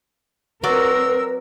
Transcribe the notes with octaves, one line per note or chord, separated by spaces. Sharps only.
F#3 C4 F#4 A#4 B4 D5 E6